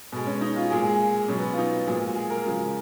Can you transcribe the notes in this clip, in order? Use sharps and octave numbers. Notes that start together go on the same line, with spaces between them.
B2 G#3
C#4
D#4
F4
A#2 G#3 G#4
G#4
B2 F#3 C#4
B3
F4
D#4
A#2 F3 G#3 F4
F#4
G#4
A#4
C#3 F3 G#3